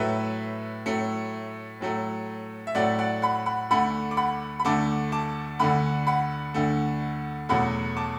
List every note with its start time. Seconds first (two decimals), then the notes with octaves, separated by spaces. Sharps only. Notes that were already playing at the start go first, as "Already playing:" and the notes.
Already playing: A2 F#3 A3 B4 E5
0.86 A2 F#3 A3
1.81 A2 F#3 A3
2.67 E5
2.75 A2 F#3 A3 D5 F#5
2.99 D5 F#5
3.22 F#5 B5
3.46 F#5 B5
3.70 D2 D3 A3 F#5 B5
4.11 D6
4.17 F#5 B5
4.60 B5
4.65 D2 D3 A3 A5 D6
5.12 A5 D6
5.59 D2 D3 A3 F#5 B5
6.07 F#5 B5
6.54 D2 D3 A3
7.49 E2 B2 F#3 A3 F#5 B5
7.97 A5 D6